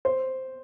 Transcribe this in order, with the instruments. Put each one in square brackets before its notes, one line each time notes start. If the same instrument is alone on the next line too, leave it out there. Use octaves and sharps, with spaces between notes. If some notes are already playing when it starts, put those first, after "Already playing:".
[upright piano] C5